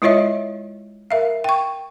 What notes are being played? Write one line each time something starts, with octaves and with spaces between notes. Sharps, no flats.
G#3 E4 F4 C#5 D#5 E5
A#4 E5 F5
G5 C#6